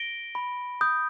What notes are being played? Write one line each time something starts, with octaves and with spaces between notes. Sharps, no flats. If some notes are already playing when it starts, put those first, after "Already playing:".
Already playing: A#6 D7 G7
B5
D#6 G6